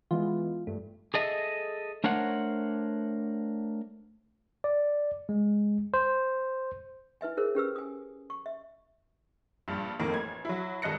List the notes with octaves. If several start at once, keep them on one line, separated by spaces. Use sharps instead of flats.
E3 G#3 B3 F4
G2 A3
G#4 A4 D#5 E5
A3 D4 A#4 C5 C#5 F#5
D5
G#3
C5
E4 B4 E5 G#5
E4 G#4 A#4 C5
C#4 G4 B4 E6
G#5 D#6
C#6
E5
A#1 G2
F2 A2 D#3 A#3
A1 G#6
F#3 E4
G#1 A4 D#5 F#6 A#6 C#7